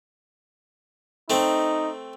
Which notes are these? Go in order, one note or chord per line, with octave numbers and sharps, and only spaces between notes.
A3 C4 D#4